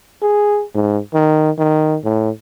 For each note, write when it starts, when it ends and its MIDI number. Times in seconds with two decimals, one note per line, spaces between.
0.22 0.63 68
0.75 0.98 44
1.14 1.50 51
1.58 1.97 51
2.04 2.30 45